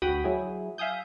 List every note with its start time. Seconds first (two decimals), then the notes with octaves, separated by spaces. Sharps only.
0.02 D2 F#4 G5 B5 D#6
0.24 F#3 E4 G#4
0.78 E5 F5 G#5 D#6 G6